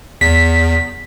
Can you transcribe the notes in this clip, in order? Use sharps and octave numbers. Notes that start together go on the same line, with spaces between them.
E2 B6